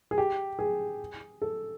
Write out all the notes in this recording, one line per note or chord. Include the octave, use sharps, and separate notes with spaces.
G#4
G4
G#4
A4